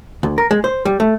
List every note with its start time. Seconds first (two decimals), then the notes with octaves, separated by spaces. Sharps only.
0.23 D2
0.38 A#4
0.51 G#3
0.64 C5
0.85 G3
1.00 A3